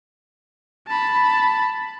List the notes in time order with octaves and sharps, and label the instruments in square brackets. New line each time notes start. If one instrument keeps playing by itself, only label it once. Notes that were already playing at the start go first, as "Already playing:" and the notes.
[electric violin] A5 B5